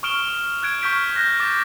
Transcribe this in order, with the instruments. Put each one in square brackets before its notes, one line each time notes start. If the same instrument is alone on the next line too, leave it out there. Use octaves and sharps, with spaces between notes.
[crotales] C#6 D#6 F6 D7 E7 G7
F#6 G#6 D7
C#6 F6 G6 B6 D7
F#6 G6 A#6
D6 A6